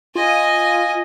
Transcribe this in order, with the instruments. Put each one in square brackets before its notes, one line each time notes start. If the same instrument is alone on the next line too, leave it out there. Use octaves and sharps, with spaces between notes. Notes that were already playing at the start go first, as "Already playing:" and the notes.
[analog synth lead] F4 [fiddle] D#5 G#5